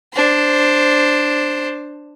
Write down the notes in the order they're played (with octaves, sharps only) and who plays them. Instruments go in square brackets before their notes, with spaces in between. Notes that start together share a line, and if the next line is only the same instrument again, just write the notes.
[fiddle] D4 C5